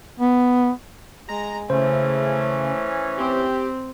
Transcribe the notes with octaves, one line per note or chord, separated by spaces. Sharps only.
B3
G#3 A#5
C#3 E3 A3 C#4 C5
C4 G4